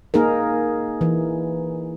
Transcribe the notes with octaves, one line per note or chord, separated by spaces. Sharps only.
A#3 D#4 G#4 A#4
E3